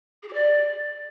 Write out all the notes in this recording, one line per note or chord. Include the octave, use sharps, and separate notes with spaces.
G#4
G4
D5